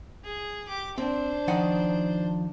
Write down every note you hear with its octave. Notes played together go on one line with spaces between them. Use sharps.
G#4
G4 D6
C4 D4 C5
D#3 F3 D#4 F#5